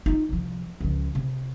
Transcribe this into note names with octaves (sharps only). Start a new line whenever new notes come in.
D#4 F4
C2 F3
C#2 F3
C3